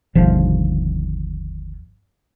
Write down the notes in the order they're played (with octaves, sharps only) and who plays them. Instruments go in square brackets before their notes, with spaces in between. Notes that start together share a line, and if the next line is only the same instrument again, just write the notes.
[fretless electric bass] G1 D#2 B2 F3